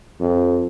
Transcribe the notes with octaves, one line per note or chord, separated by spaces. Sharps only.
F2